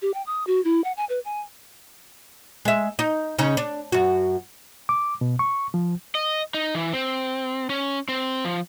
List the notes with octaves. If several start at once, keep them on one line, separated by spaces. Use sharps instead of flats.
G4
G5
D#6
F#4
E4
F#5
G#5
B4
G#5
G#3 E5
D#4
C#3 C#4 D#4
D4
F#2 F#4
D6
B2
C#6
F3
D#5
D#4
E3
C4
C#4
C4
F3